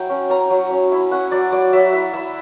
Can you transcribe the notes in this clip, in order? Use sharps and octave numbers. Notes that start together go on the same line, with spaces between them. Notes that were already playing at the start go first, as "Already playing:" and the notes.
Already playing: F#3 E4 G5
C#4
C#4 A#5
F#3
C#4
E4
C#4 F#5
F#3 D5
F#3 D5
F#3 E5
E4 E5
E4 E5